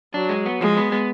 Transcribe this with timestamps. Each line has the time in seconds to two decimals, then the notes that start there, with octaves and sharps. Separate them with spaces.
0.14 F#3 D4
0.29 G#3
0.46 B3
0.61 F3 G#3
0.77 B3
0.92 B3